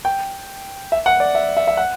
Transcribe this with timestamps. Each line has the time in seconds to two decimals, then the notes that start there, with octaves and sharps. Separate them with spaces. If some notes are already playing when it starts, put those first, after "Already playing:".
0.05 G5
0.92 E5
1.06 F#5
1.20 D5
1.35 E5
1.57 E5
1.67 E5
1.77 F#5